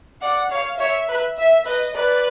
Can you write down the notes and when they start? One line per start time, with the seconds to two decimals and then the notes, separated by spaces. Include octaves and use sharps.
0.22 D5 F#5
0.50 C#5 F5
0.79 C#5 E5
1.08 B4
1.37 E5
1.66 B4 D#5
1.95 B4 D5